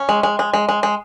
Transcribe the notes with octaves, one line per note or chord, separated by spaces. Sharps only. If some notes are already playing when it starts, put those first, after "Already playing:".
Already playing: C#4
G#3
G#3
G#3
G#3
G#3
G#3